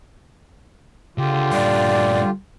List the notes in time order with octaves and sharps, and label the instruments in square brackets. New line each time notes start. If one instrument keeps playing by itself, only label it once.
[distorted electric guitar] C#2 [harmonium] D3 F4 G4
[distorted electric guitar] G2 A#2 [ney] D5